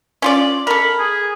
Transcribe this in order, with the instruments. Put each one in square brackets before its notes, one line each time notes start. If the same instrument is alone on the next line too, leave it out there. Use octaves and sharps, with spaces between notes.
[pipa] C#4 F4 D5
[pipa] A4 A#4 [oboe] B5
[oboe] G#4